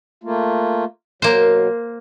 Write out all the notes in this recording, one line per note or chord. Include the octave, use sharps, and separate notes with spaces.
A3 A#3 F4
B2 F#3 A#3 C5